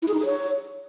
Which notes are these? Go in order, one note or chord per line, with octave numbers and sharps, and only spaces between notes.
E4
G#4
D#4
G#4
C#5